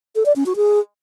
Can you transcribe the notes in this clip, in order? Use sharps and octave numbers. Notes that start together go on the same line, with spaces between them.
A4
D5
C#4
F#4
G#4